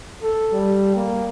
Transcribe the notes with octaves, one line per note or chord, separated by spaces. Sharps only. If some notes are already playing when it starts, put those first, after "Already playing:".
A4
G3
A#3